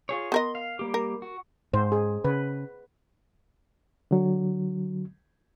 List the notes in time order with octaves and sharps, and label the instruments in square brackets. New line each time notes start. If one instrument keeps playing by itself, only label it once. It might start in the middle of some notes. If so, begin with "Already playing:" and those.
[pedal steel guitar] F4 G#4 C#5
[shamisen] B3 A#4 D#5 [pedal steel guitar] C6
[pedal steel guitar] F5
G3 A#3 G4
[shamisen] A#4
[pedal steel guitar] F#4
[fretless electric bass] G#2 [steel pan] C5
[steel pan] G#4
[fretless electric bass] C#3 [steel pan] B4
[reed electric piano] D3 F#3